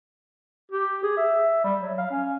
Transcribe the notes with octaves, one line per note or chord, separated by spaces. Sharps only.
G4
G#4
E5
G3
F#3
F5
C#4